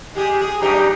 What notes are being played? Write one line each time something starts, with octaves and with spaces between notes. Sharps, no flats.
G#3 G4 G#4
G#4
F#2 D#4 G4